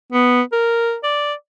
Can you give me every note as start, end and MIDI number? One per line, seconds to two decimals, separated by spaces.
0.12 0.42 59
0.52 0.97 70
1.04 1.33 74